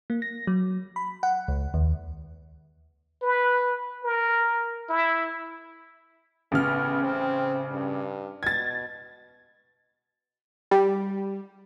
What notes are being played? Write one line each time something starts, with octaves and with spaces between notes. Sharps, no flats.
A#3
A#6
F#3
B5
F#5
C#2
D#2
B4
A#4
E4
A1 C#3 B3 F6
C4
G2
B2 G#6 A6
G3